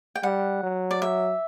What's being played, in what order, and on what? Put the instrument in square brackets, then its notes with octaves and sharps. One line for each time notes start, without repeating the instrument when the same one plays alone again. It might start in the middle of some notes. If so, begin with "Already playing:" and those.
[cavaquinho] G5
[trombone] G3 [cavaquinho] F#5
[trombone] F#3
[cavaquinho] D5
E5